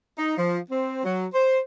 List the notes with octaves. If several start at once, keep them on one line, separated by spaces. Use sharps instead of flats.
D#4
F3
C4
F#3
C5